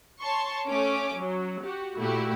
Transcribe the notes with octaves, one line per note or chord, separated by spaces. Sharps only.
C#5 A5 C6 C#6
A3 C#4 D6
F#3
F#4 G4
A#2 A3 E4 F#4 G4